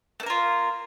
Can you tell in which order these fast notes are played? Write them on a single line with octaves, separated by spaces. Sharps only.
A3 A#3 A#4 F4